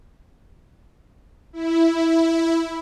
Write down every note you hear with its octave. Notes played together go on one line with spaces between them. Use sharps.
E4